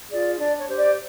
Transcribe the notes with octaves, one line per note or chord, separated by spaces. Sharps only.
F4 G#4 D5
D4 D5
C#5
G4 C5
D5